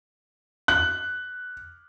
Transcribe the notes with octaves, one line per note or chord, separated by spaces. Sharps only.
F#6